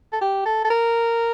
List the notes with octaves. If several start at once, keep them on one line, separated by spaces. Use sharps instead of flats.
A4
G4
A4
A4
A#4